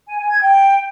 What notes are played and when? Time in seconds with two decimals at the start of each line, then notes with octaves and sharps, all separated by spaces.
0.07 G#5
0.18 G#5
0.29 G#6
0.40 G5